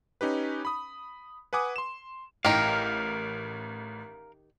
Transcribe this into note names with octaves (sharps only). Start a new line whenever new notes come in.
C#4 D#4 G4 B4
B5 D#6
B4 F#5 G#5 D6 D#6
C6 E7
A1 D#3 D#4 G4 A#4 F5